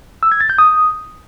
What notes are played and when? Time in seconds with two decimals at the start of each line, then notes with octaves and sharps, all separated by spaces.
0.23 E6
0.32 G#6
0.41 A6
0.50 G6
0.58 D#6